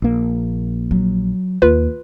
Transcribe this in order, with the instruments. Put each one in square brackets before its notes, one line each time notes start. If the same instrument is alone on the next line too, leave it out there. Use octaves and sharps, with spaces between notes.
[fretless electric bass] A#1 A#3
[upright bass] F#3
[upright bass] D#2 [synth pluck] F4 B4